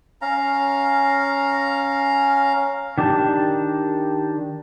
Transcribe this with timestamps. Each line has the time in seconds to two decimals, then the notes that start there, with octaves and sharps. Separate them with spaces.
0.22 C#4 F5 A#5
2.98 D#3 D4 G4 A5